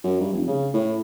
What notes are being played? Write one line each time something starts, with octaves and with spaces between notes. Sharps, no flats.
F#2
G2
F1
C#3
A2